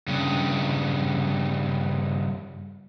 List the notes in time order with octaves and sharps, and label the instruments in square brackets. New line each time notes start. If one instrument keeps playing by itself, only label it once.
[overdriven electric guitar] G2 C#3